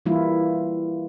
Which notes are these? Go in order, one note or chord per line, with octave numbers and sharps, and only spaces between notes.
E3 G3 A#3 E4 F4